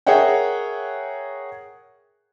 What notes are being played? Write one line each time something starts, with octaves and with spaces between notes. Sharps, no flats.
G#4 A#4 C#5 E5 F#5 G5